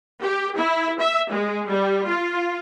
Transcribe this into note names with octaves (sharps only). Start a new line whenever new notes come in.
G4
E4
E5
G#3
G3
F4